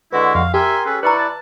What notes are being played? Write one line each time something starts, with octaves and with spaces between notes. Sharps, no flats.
D3 G#3 E4 F#4 B4
F2 F5
G4 A#4 E5 G#5 C6
C#4 G#4 A4 B4
E4 B4 D5 A#5 C#6 F#6
A5